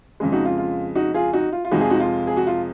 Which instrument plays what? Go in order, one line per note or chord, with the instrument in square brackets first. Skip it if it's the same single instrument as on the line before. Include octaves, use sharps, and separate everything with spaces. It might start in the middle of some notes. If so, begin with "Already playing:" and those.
[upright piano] F2 C#3 G#3
D#4 F#4
F4
F4
D#4 F#4
F4 G#4
D#4 F#4
F4
F4
F2 C3 F3 G#3 D#4 F#4
F4 G#4
D#4 F#4
F4
G#4
F#4
F4